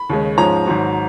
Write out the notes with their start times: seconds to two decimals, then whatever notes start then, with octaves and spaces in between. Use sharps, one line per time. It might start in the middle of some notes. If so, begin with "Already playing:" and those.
Already playing: B5
0.10 D#2 C#3 G#3
0.38 G#2 F3 G#3 C#4 A#5
0.66 G#1 G#2 F#3